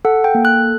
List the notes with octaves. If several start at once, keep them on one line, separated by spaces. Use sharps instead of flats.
A4 F#5
G5
A#3
F#6